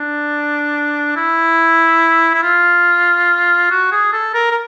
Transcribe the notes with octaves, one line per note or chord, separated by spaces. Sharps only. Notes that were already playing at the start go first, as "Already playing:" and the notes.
Already playing: D4
E4
E4
F4
F#4
G#4
A4
A#4
A#4